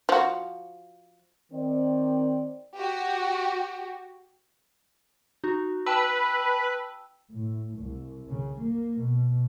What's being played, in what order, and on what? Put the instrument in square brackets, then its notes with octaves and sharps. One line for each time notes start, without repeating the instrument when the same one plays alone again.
[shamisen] F3 F#4
[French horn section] D#3 C4 D5
[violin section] F#4 G4
[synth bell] D#4 F#4
[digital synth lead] B4 [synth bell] G5 A5 E6
[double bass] A2
C2
C#3
A#3
B2